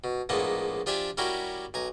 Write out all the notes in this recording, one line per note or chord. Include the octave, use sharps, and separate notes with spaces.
B2
A#1 A2 G#3 A#3 B3 A4
F3 D4 G4 D5 E5 G#5
G3 C#4 E4 F#4 G4 A#4
B1 G#5 A#5